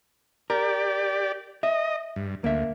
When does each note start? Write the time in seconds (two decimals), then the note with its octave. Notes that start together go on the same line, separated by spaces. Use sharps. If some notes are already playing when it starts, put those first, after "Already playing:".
0.50 G4 A#4 D5
1.63 D#5 E5
2.16 G2
2.44 D2 A#3 E5